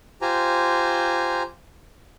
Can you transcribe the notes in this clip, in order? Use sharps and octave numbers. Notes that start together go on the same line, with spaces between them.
F4 G4 C5 G#5 A#5